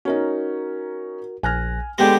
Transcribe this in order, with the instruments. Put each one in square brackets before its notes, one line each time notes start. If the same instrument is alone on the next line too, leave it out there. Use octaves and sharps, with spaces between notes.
[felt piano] C#4 D#4 [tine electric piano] F#4 A#4
[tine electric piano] A#1 F#6 A#6 [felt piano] G#5 F6
[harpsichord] D3 G#3 B3 [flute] G4 [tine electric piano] A#6